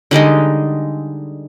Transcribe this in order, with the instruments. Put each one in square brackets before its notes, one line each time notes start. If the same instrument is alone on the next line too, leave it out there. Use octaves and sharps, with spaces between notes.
[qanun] D3 G3 G#3 D#4